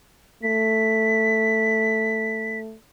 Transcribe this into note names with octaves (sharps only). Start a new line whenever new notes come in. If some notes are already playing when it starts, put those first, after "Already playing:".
A3 B6